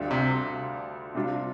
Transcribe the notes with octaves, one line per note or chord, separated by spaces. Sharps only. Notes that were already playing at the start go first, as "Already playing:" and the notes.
Already playing: D2 D3 G3 D4 F4
C3
C3 G3 D4 F4